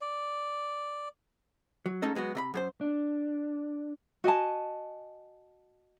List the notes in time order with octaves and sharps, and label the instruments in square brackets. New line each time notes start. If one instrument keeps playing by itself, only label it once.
[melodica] D5
[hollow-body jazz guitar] F#3
G#2 A3 C#4 D#4 A4 D#5
F#3 G#3 B3 F#4
C3 D#5 B5
F#2 G#4 C5
[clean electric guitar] D4
[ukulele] F#4 D#5 G#5 A5